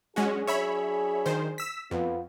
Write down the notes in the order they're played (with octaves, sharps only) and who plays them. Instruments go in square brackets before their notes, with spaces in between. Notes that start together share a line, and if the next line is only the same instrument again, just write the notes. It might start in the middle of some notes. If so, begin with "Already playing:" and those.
[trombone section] F#3 D4 G#4 [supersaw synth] G#3 C#4 F#4
[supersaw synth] C#5 E5 B5
D#3 C5
E6 B6
[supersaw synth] F2 [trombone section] B3 F4